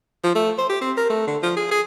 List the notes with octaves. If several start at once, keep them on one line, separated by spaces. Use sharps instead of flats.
F3
A3
C5
G4
C4
A#4
A3
D3
F3
G#4
G#4